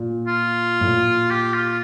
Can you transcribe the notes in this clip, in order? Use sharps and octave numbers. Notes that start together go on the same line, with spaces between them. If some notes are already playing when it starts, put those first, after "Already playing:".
Already playing: A#2
F4
A2
A#2
G4
F4